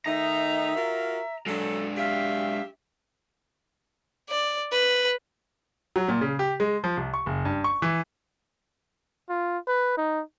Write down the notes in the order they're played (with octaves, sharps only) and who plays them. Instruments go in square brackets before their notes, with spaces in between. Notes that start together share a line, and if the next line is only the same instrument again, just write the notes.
[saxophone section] D#3 A3 D#4 [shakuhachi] E5 [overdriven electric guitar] A#5
[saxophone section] F4 F#4 A#4
[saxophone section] F#3 A4 [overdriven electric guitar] G#3 D4
[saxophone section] F#3 G4 E5 [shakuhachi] F5
[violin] D5
B4
[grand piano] F#3
A#2
C#3
G4
G#3
F3
C2
C#6
F#1
G2
C#6
E3
[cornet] F4
B4
D#4